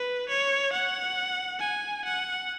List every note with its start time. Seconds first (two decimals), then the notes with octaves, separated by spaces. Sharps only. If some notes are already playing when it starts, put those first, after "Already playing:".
Already playing: B4
0.29 C#5
0.73 F#5
1.60 G#5
2.05 F#5